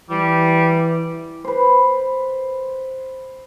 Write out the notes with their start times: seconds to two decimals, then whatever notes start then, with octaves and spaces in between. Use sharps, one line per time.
0.10 E3 G3
1.44 B4 C5